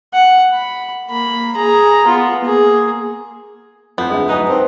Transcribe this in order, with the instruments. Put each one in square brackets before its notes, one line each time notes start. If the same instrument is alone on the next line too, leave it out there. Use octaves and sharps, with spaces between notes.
[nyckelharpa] F#5
B5
A#3 B5
G#4 A#5
B3 F4
A#3 G#4
[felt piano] F2 G6 [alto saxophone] F3 [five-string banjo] B3
[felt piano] D2 E5 [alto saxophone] G#3
[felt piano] G#2 F#3 G#5 [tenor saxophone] D#4 [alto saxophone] B4
[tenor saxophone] C4 [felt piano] D#4 A#4 A5